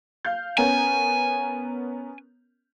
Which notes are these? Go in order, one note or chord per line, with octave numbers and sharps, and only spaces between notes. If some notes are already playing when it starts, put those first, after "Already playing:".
F5 G6
B3 C#4 A#4 G#5